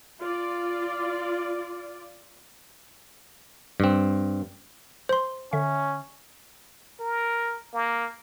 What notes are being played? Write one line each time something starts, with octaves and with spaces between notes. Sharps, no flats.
F4 D5
G2 C4
C5 C6
D3 C#4 E5
A#4
A#3